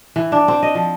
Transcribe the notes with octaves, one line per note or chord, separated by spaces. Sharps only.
E3
D4
C4
D#5
F3